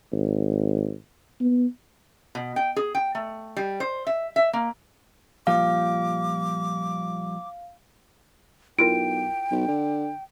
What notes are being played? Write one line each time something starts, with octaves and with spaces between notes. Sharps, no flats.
G#1
B3
B2
G5
G#4
G5
A3
G3
C5
E5
E5
A#3
A#2 F3 G3 F5 D6
B1 E4 F4 A#4 G5 D7
B1
D3